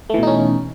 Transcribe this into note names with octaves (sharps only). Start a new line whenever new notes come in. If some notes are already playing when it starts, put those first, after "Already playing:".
B2 E3 A3 C#4 D#4